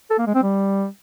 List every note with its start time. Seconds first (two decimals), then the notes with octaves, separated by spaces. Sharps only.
0.10 A4
0.19 A#3
0.27 G#3
0.35 C4
0.43 G3